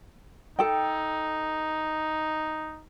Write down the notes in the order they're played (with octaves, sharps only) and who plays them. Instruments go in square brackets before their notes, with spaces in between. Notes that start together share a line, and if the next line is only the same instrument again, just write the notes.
[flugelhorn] D#4 [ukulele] A4 G5